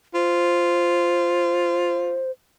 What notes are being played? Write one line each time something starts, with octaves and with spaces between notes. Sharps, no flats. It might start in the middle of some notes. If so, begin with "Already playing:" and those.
F4 C5